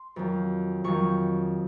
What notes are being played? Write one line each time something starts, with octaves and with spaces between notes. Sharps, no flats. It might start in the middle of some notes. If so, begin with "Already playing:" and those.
Already playing: C6
F2 D#3 F#3
F2 D#3 F#3 C#6